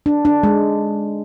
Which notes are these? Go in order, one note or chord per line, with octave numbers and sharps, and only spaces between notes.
D4
D4
G#3